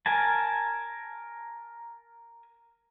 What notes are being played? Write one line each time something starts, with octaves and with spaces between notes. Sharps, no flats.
A#4 G#5 A5